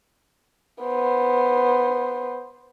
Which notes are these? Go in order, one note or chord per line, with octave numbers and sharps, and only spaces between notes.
B3 C5